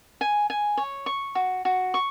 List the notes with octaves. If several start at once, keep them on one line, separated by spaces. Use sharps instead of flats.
G#5
G#5
C#5
C#6
F#4
F#4
C#6